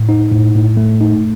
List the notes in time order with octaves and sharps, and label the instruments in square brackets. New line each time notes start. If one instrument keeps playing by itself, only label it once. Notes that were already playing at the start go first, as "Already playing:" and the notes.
Already playing: [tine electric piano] A2
D#4
A2
A2
A3
D#4